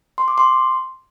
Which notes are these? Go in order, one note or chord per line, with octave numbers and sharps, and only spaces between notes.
C6
D6
C6